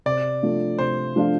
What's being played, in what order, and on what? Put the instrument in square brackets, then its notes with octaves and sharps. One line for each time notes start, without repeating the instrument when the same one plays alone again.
[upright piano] C3 [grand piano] D5
[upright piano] F3 A3 D4 F4
[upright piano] C3 [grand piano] C5
[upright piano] F3 A3 D4 F4